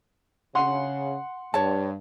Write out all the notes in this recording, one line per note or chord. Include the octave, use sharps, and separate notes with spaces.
C#3 F#5 C6
G2 C#5 A5